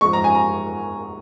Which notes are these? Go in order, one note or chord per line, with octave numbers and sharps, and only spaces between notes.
G#2 F3 G#3 C#6
A#5
G#5
A#5